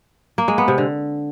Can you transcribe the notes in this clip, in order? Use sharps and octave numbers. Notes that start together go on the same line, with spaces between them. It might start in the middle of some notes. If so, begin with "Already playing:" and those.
A#3
G#3
B3
C3
D3